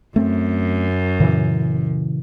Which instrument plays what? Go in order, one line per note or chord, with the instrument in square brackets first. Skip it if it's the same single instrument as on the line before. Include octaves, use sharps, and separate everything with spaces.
[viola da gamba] F#2 [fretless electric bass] A3 C4
[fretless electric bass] A#2 C#3 E3